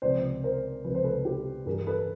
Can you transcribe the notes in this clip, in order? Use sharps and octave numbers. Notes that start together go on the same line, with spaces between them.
C#2 C3 F3 C5 D5
A#4 C5
C#2 C3 F3 B4
C5
A4 B4
G4 A4
G2 E3 G3 G#4 A#4
A4 B4